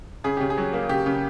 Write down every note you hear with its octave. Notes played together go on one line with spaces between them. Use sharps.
C#3 G#4
C#3 G4
G#4
F#3
A#3
C#3 G4
C#3